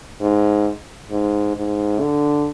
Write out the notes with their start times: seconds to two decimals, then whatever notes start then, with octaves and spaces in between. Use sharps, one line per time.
0.21 G#2
1.11 G#2
1.56 G#2
2.01 D3